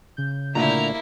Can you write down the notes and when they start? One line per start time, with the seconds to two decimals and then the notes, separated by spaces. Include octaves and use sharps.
0.17 C#3 G6
0.55 A#2 D3 A3 A#3 E4 A#5